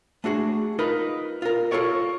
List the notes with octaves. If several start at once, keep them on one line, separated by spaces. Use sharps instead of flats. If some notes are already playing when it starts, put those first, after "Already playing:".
A3 D4 F#4 G#4
D#4 F4 A#4 B4
F4 A#4
F4 A4 A#4 C#5 D5